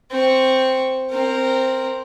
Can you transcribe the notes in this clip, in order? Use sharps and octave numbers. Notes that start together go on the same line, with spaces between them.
C4 C#6
C4 A#4